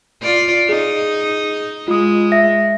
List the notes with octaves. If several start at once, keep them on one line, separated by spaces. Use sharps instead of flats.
F4 D5
D#4 G#4
G#3 F4 D#6
E5 A#6